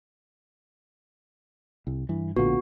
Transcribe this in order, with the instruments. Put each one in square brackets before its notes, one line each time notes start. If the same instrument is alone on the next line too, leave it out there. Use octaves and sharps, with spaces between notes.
[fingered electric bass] C2
[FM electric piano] G2 [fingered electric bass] E3
[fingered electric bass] A#1 A2 D3 [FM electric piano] B3 F4 [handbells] F#4